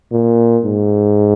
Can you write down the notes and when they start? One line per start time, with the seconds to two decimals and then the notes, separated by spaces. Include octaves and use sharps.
0.11 A#2
0.65 G#2